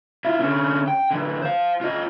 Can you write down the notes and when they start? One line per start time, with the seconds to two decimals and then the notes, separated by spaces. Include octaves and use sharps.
0.25 E4 F4
0.40 D3 C#4
0.88 G5
1.11 D3 E3
1.42 C5 F5
1.81 F4 D#5